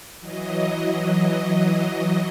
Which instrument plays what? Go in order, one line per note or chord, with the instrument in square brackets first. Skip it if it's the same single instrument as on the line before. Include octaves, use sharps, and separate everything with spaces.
[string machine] E3 F#3 D#5